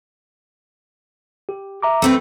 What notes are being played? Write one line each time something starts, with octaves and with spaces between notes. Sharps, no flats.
G4
E5 A#5 D6
A3 C4 B4